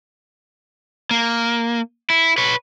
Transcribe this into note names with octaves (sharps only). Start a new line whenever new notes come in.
A#3
E4
B4 C#5